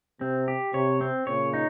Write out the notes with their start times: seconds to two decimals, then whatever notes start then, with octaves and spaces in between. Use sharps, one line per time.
0.21 C3 C4
0.48 G4
0.74 C3 C#5
1.01 C4
1.27 A#2 C#3 C#5
1.54 D#4